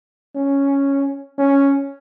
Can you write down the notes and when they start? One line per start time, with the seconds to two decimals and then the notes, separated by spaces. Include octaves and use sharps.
0.35 C#4
1.38 C#4